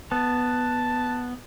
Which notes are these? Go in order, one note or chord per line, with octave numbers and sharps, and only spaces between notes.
B3 A5